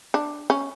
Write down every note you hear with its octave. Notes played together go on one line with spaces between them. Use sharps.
D4
C#4